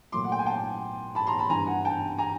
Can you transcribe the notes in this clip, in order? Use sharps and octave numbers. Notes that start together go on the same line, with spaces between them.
A#2 F#3 A3 C6 D6
F#5
G5
G#5
G5 A5
A5 B5
A#5 C6
A5 B5
G2 E3 G3 G#5 A#5
F#5 G#5
G5 A5
G#5 A#5